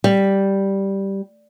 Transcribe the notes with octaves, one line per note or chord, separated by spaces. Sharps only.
G3